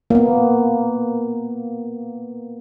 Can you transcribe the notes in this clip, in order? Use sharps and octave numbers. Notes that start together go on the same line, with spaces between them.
A#3 B3